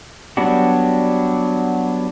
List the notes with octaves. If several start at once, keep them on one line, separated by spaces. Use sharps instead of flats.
F#3 G3 B3 D4 F#4